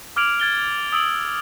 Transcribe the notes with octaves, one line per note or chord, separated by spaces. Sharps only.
D6 F6 G#6 D7 F7 F#7
G#6 A6 G7
D#6 E6 D7 F#7